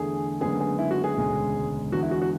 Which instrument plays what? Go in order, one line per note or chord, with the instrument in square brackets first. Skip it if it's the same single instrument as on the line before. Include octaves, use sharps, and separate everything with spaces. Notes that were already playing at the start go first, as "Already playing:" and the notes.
Already playing: [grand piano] E2 D3 A3 G#4
F#1 F#2 D3 G#3 B3 G#4
G#4
E4
F#4
G#4
E1 D2 C#3 G#3
E2 D3 G#3 F#4
E4
F#4
F#4